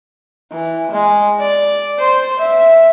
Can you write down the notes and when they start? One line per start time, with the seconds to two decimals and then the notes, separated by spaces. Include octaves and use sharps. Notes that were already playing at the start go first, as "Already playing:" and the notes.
0.52 E3
0.91 G#3
1.39 D5
1.99 C5
2.39 E5